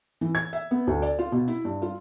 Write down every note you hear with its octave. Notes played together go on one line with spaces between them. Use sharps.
E3
G#6
E5
B3
D2
D5
F4
B2
E4
G2
F4